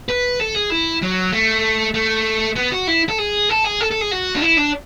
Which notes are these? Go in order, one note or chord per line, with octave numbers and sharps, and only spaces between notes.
B4
A4
G#4
E4
F#3
A3
A3
B3
F#4
E4
A4
G#4
A4
G#4
A4
A4
G#4
F#4
D4
E4
D4